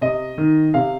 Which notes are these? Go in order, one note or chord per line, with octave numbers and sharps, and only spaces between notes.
C3 D#5
D#3
C3 F5